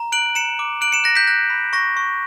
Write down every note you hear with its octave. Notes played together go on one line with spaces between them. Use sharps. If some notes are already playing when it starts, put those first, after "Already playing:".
Already playing: A#5
F#6 D7 F#7
A#5 C#7 E7
D6
F#6 D7 F#7
C#7 E7
F#6 A#6 C#7
G6 B6
F#6 A#6
B5
C#6 A#6
C#6